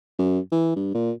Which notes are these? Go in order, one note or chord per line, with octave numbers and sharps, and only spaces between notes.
F#2
E3
G2
A#2